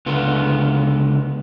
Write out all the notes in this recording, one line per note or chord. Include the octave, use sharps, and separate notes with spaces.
C#2 D3 B3 F4